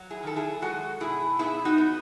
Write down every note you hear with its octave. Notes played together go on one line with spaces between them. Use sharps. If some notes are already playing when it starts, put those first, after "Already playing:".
Already playing: F#3
E4 G#4
D#3 A4
E4 G#4
G#3 F#4 A4
B2 E4 G#4
B3 E4 G#4
D#4 F#4
B3